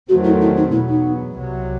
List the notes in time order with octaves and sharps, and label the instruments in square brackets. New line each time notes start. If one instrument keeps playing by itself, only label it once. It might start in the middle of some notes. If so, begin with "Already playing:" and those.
[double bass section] E2 D#3 F#3 A3 C4 [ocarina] F#4
[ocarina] E4
E4
D#4
[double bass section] E2 B2 F#3 B3 [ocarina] E4
[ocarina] D#4
[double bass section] C2 C3 F#3